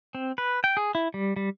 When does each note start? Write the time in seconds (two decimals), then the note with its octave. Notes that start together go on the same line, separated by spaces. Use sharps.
0.15 C4
0.38 B4
0.64 G5
0.77 G#4
0.95 E4
1.14 G3
1.36 G3